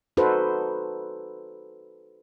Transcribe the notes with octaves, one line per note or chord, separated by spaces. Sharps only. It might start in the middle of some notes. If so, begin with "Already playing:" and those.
D#4 F#4 A4 B4 C5